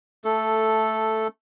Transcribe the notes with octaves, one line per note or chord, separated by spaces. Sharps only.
A3 A4